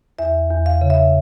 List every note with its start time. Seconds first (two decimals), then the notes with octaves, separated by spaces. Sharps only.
0.19 E2 E5
0.50 E2
0.66 F5
0.81 C#3
0.90 E5